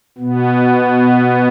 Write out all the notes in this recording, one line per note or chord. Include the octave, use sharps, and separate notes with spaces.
B2 B3